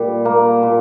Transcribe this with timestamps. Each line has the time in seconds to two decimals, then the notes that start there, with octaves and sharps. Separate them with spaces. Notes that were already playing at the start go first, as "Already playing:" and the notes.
Already playing: A#2 G3
0.25 A#3
0.63 A#2